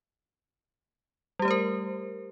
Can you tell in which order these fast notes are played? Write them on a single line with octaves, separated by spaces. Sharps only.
G3 G4 A3 C5 A#4